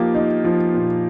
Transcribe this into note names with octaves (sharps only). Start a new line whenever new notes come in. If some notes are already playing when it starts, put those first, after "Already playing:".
Already playing: F3 A#3 D#4 F4 G4
D#4
F3
A#2